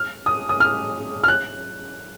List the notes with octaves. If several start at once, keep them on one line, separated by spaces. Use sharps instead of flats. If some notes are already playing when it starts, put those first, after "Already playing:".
Already playing: F6
D#6
D#6
F6
F6
F#6